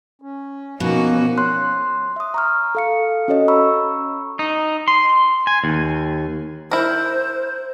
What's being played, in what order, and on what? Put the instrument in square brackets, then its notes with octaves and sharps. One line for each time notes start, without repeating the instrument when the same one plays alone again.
[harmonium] C#4
[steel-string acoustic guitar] B2 [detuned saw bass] F3 [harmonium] A#3 C#4 [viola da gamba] D#4 F#4
[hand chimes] C#5 C6 F#6
E5 D#6
A#5 C#6 F6
A4 F5 C#7
C#4 F#4 A4 C#5 D#5
A#5 B5 C#6 E6
[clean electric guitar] D#4
C6
G#5
D#2
[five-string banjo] E4 A#4 [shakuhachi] C5